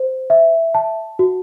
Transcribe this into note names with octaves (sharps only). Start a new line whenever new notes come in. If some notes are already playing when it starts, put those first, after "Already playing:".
Already playing: C5
E5
A5
F#4